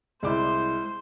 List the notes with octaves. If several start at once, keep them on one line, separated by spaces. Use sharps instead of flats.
C2 G#3 E4 C5 D5 D6